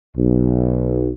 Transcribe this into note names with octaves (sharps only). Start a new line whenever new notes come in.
B1